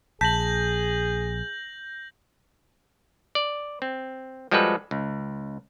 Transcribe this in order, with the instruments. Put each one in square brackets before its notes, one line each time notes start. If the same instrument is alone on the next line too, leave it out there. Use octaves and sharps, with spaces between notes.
[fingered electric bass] A#1 [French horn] G#4 [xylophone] A5 B6 [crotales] G6 A#6 F#7
[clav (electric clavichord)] D5
C4
F3 G3 G#3 F#4 A4 B4
C#2